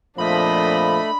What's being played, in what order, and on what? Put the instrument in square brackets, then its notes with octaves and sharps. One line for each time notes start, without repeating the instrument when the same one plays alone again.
[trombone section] F2 A#2 F3 [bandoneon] A3 [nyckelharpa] D4 D#5 [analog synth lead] B5